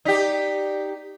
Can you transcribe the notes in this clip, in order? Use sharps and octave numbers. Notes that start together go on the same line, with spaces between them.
D#4 G4 D5 B6